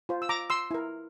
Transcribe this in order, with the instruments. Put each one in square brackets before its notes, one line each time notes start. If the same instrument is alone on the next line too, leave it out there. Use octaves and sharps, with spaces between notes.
[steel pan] F4 C5
E6
A#5 D6
C6 E6
E4 A#4